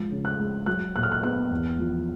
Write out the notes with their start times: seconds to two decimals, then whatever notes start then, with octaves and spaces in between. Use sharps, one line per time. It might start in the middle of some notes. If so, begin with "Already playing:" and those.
Already playing: G#2 F3
0.11 C#3
0.25 F#6
0.39 G#3
0.66 F#3 F#6
0.95 A#2 F#6
1.03 F6
1.12 F#6
1.23 B3 F#6
1.51 E2
1.79 F3